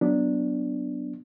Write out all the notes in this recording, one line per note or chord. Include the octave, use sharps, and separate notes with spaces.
F#3 B3 D4